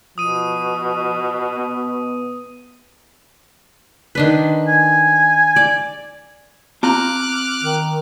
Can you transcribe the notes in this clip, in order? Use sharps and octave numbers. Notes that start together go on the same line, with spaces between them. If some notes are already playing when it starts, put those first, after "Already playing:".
B2 F3 D#6 D#7
B3
D#3 D4 B4
G#5
D5
C4 F4 A#5 D6 F6 F#6
D#3